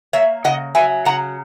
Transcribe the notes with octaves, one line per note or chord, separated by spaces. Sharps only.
A#3 C#5 E5
C#3 D#5 F#5
F#3 E5 G#5
C#3 F#5 A#5